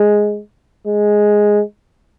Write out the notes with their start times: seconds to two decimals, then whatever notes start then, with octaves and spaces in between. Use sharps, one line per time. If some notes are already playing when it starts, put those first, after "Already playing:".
Already playing: G#3
0.87 G#3